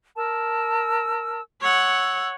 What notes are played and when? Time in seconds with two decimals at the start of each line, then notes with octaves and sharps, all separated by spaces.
0.16 A#4 A5 E6
1.61 C#5 F#5 E6